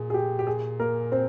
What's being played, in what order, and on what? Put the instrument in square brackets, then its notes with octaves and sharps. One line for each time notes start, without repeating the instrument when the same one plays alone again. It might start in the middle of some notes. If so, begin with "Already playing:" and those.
Already playing: [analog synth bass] A#2 [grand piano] G#4
[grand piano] G#4
G4
G4
G#4
A#3 A#4
C4 C5